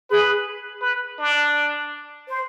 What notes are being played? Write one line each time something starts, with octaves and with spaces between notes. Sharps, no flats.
G#4 B4
B4
D4
C5